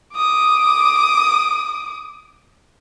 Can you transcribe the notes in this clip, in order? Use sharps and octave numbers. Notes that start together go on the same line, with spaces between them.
D6 D#6